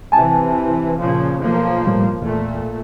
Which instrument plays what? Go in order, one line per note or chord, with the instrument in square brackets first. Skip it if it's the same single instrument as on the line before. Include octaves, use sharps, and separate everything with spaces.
[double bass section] C3 E3 [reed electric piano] G#5 A5
[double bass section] A#2 C#3 F3
B1 F3 A#3
[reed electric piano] A2 G3
[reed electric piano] E2 [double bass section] A#2 A3